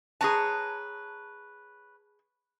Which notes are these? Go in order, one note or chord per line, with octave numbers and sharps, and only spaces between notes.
G#4 B4 C#5 A5 A#5